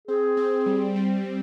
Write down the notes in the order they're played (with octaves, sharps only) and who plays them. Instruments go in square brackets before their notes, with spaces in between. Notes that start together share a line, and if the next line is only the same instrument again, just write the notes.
[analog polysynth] C4 [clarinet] G#4
[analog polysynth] C4
G3
G3
G3